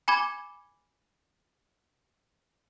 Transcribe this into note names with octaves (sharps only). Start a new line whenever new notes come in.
G#5 B5 D6 G#6